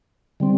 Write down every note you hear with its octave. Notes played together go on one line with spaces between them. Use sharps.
D3 G3 C4